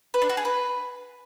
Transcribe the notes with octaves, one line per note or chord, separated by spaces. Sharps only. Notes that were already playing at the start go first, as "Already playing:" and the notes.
B4
D4
F#4
G#4
B4